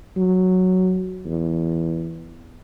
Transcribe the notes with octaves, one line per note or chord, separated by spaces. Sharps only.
F#3
E2